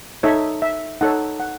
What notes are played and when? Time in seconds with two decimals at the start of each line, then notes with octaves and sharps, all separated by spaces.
0.23 D#4 A4 C#5 E5
0.62 E5
1.01 D#4 A4 C#5 F#5
1.40 F#5